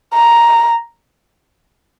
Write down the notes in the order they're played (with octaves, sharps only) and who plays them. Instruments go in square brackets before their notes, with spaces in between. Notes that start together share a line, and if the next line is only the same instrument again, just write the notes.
[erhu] A#5